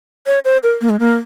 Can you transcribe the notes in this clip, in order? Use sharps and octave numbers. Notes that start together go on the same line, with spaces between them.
C#5
C5
A#4
A#3
G#3
A#3